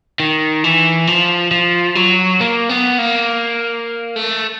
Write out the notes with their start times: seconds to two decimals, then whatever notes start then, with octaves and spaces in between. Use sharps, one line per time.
0.20 D#3
0.64 E3
1.07 F3
1.51 F3
1.95 F#3
2.41 A#3
2.69 B3
2.99 A#3
4.16 A3